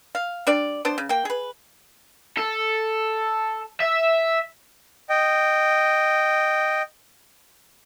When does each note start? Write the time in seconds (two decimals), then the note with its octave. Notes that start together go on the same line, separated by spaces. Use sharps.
0.15 F5
0.47 G3 D4 D5
0.85 B3 D4 C5
0.98 C#3
1.09 A#3 G5
1.25 G#4 B4
2.38 A4
3.80 E5
5.10 D#5 G5